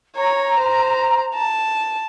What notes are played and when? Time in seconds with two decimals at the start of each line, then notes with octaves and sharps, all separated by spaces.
0.16 C#5 A#5
0.60 C5
1.35 A5